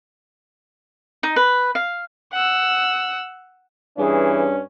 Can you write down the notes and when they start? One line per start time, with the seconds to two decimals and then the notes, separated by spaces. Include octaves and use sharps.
1.23 D#4
1.36 B4
1.75 F5
2.33 F#5 E6
3.98 G2 E3 C#4 G#4